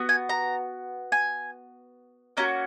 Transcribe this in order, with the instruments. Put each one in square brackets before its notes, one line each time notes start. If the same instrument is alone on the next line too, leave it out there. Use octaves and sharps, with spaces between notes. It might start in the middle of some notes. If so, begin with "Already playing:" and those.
Already playing: [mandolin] B3 F#4
G#5
A#5
G#5
A#3 C#4 F#4 A#5